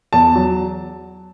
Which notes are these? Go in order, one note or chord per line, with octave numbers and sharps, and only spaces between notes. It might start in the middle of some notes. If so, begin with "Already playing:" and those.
E2 A5
F#3